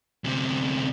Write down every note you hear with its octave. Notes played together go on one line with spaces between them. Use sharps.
D2 C3